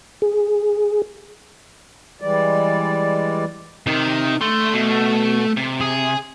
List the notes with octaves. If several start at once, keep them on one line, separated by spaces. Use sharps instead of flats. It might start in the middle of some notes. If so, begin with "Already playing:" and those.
G#4
E3 G3 G#3 D5
C3 D#3
D3 A3 C6
B2
C3
G#4